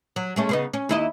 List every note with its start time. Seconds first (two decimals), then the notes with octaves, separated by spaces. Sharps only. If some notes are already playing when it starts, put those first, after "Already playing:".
0.16 F#3
0.36 G#3 A3 C#4
0.49 C#3 B3 D#4
0.74 C#4
0.89 D#2 E4 D#5